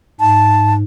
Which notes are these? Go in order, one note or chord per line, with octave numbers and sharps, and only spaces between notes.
G#2 A5